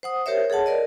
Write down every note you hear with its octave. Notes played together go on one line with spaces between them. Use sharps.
C5 F#5 D#6
G4 A#4 C5 C#5 E5
G#4 A4 C#5 F#5 A5
A#4 D5 D#5